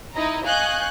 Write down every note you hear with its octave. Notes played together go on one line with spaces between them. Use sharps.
D#4 E4 D#5 A#5
D#5 F5 G#5 C#6 F#6 G6